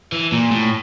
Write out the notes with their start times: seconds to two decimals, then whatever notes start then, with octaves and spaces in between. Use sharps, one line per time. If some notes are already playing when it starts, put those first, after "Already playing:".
0.12 E3
0.32 A#2
0.51 A2